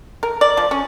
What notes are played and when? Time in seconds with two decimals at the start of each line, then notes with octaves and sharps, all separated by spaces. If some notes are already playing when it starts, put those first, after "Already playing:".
0.23 A#4
0.41 D5
0.57 F3
0.71 C#4